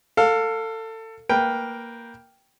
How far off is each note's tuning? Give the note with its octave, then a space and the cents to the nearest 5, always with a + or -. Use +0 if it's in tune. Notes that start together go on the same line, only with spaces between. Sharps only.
A4 +25 F5 +15
A#3 +0 B4 -10 G5 +0